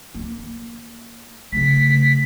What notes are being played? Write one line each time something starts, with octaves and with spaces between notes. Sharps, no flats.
A#3
C#3 A3 B6